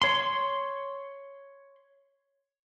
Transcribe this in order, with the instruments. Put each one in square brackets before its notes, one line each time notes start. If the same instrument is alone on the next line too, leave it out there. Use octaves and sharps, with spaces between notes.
[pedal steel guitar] C#5 C6